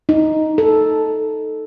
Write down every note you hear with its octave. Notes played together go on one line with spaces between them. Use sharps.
D#4
A4